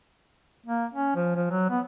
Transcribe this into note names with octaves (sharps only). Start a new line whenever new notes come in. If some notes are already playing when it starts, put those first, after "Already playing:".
A#3
C#4
F3
F3
F#3
B3